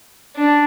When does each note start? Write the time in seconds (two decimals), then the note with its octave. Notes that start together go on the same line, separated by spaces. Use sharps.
0.37 D4